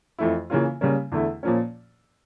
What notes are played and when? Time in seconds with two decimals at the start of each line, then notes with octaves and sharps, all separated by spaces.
0.19 F2 E3 A3 E4
0.50 C#3 E3 A#3 C#4 F4
0.81 C#3 G3 A#3 C#4
1.12 E2 D3 A3 E4
1.43 A#2 F3 A#3 C#4